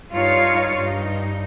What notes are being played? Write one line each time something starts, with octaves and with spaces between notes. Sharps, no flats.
G2 D#4 F4 C#5 F5
G2 D#4